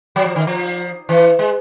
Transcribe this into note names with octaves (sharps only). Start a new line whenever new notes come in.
F#3
F3
D#3
F3
E3
G#3